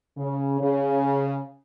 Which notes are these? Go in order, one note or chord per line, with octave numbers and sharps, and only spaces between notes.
C#3
C#3